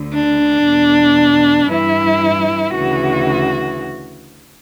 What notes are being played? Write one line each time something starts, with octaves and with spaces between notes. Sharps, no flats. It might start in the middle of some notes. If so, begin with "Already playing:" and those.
Already playing: D2 D3
D4
E2 B2
G2 E3 E4
D2 C#3 E3 F#4